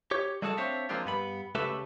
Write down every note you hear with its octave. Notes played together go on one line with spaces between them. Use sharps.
G4 C#5
G3 A3 F#4 G#4 A4 A5
C4 D4 C5 C#5 E5 F5
F3 G#3 A#3 C4 D4 F4
G2 B3 B5
C#2 A3 G4 A4 B4 E5